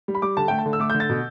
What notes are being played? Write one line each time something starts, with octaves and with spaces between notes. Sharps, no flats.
G3
B5
G3 D6
D3 A5
A3 G5
A5
D3
E6
A3 D6
G6
D3
A6
B2